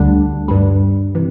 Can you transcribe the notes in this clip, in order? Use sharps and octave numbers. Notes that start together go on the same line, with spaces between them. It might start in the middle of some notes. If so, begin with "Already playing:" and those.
Already playing: D2 D3 G3 D4
G2 G3
C3 E3